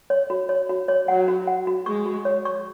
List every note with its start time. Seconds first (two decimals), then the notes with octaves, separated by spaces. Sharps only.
0.10 C#5
0.30 F#4
0.49 C#5
0.69 F#4
0.88 C#5
1.08 F#3 F#5
1.28 F#4
1.47 F#5
1.67 F#4
1.86 G#3 C#6
2.06 F#4
2.25 C#5
2.45 C#6